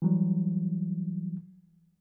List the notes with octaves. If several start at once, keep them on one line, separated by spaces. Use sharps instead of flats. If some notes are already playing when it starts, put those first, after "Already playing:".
E3 F#3 G3